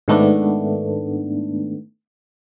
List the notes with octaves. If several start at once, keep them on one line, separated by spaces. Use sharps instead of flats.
G#2 D#3 A3 B3 D4